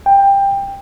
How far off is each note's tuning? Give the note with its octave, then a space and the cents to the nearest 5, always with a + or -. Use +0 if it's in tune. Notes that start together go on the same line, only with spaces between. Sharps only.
G5 +15